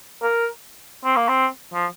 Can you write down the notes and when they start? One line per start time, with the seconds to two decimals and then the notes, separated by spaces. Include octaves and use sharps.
0.22 A#4
1.04 C4
1.16 A#3
1.28 C4
1.73 F3